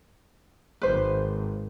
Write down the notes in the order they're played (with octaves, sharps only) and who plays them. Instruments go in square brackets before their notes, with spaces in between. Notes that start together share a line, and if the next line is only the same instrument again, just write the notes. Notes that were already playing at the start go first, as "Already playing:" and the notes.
[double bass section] G#1 [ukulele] B4 C5